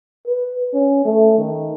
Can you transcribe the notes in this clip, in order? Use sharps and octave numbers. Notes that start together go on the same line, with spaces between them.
B4
C#4
A3
D#3